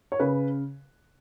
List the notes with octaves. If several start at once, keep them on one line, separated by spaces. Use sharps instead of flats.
C#5
C#3 B4